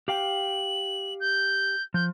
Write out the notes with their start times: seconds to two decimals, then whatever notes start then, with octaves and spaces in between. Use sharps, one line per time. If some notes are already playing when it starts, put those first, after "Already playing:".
0.08 G4 F5 G5 F#7
1.20 G6
1.94 F3 G6